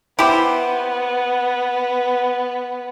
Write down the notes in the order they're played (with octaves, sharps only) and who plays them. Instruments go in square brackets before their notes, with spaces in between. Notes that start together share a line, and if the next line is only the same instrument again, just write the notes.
[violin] B3 [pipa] E4 G4 C5